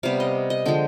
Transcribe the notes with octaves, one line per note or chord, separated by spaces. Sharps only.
C3 G3 B3 F5
D#5
D#5
D3 F3 G#3 G5